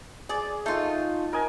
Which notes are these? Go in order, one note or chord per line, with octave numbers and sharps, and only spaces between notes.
G#4 D5
A3 D#4 F4
A#4 D#5 G#5